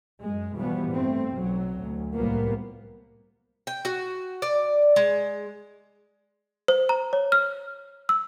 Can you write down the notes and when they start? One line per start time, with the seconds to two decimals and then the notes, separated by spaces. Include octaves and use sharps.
0.23 F#2 G#3
0.54 B2 E3 F3 G3 B3
0.91 G2 A3 C4
1.32 B1 F#3
1.79 D2
2.15 C2 A2 F3 G3 A#3 B3
3.67 G5
3.85 F#4
4.42 D5
4.96 G#3
6.68 C5
6.89 A#5
7.13 C#5
7.32 F6
8.09 E6